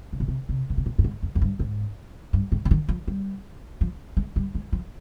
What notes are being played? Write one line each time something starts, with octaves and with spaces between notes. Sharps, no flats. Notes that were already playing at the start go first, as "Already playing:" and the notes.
C3
A#2
C3
C3
C#3
C3
A#2
G2
G#2
F2
F2
G2
G#2
G2
G#2
C#3
D#3
F3
G3
F3
G#3
G3
G#3
F3